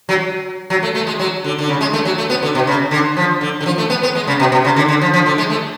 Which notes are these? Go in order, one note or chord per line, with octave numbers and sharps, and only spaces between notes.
F#3
F#3
A3
A3
G#3
F#3
D3
D3
C#3
G#3
A3
F#3
A3
B3
D3
B2
C#3
D3
F3
D3
D3
F3
A3
B3
B3
G#3
C#3
B2
B2
C#3
D3
D3
F3
F3
D3
G#3
A3